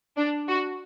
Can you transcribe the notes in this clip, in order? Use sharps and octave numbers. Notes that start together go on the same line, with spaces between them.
D4
F#4